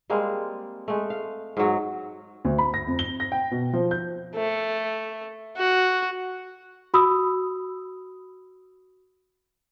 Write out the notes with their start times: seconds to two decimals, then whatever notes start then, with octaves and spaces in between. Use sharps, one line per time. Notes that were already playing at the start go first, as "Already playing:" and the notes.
0.10 G3 G#3 A#3 C4
0.88 G#3 A3
1.10 F5
1.57 G#2 F#3
2.45 D2
2.58 B5
2.74 A#6
2.87 F2
2.99 G7
3.20 A#6
3.32 G5
3.51 B2
3.73 F3
3.91 G6
4.36 A3
5.57 F#4
6.94 F#4 B5 D#6 E6